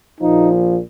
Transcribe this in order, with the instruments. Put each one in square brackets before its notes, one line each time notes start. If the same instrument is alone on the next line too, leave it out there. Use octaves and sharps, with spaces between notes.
[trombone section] A#1 A#2 F3 D#4